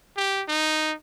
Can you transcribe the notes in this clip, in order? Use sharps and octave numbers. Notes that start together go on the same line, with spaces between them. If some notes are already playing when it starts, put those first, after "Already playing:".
G4
D#4